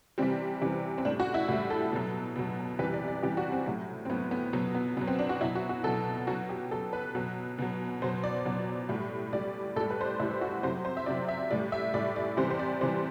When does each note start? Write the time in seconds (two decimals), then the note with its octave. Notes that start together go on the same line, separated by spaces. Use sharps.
0.18 C3 E3 G3 C4
0.61 C3 E3 G3
0.98 C4
1.05 A2 G3 D4
1.20 F#4
1.34 E4
1.48 A2 G3 F#4
1.70 A4
1.92 B2 F#3
2.36 B2 F#3
2.79 C3 E3 G3 B4
2.94 D5
3.08 D5
3.22 C3 E3 G3 G4
3.37 F#4
3.52 C4
3.66 A2 F#3
4.05 C4
4.10 A2 F#3 B3
4.31 B3
4.53 B2 F#3 B3
4.75 B3
4.97 B2 B3
5.01 F#3
5.07 C4
5.19 D4
5.29 F#4
5.41 B2 F#3 E4
5.55 F#4
5.69 F#4
5.84 B2 F#3 A4
6.27 B2 F#3 F#4
6.49 G4
6.71 B2 F#3 A4
6.93 B4
7.15 B2 F#3
7.59 B2 F#3
8.02 B2 F#3 C5
8.24 D5
8.45 B2 F#3
8.89 A2 G3
9.33 A2 G3 D5
9.76 A2 A4
9.80 G3
9.90 B4
10.01 C5
10.05 D5
10.19 A2 G3 E4
10.41 F#4
10.63 C3 F#3 C5
10.85 C5
10.97 E5
11.06 C3 F#3 D5
11.28 E5
11.50 A2 G3 D5
11.72 E5
11.94 A2 G3 D5
12.16 D5
12.37 C3 E3 G3 C5
12.50 C5
12.59 D5
12.81 C3 E3 G3 C5